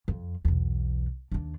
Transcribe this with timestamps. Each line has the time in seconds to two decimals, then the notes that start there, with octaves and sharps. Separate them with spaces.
0.08 F2
0.45 B1 E2
1.32 D#2 D4